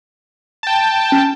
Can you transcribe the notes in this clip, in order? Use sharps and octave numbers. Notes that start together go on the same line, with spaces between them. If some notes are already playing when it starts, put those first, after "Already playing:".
G5 A5
C#4